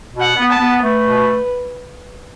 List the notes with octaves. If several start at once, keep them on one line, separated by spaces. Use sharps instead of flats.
B2
F#5
B3
A5
B3
A3 B4
B2